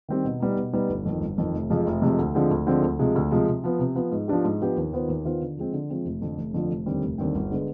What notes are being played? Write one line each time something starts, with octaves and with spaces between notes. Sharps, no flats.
D#3 G3 C4 G4
B2
G3 B3 D#4
B2
G3 B3 D#4
G1
F2 D#3
G1
F2 D#3
F1
F2 C3 F3 G#3
F1
F2 C3 F3 G#3
D2
D3 F3 G#3 C4
D2
D3 F3 G#3 C4
D2
C3 F3 G#3
D2
C3 F3 G#3
C3
F3 B3
C3
F3 B3
G#2
F3 B3 D4 G4
G#2
F3 B3 D4 G4
D#2
D#3 B3 F4 C5
D#2
D#3 B3 F4 C5
D3
F3 G#3 C4
D3
F3 G#3 C4
F1
F2 D3 F3
F1
F2 D3 F3
F1
D#2 D3 G3 C4
F1
D#2 D3 G3 C4
G1
D3 G#3 B3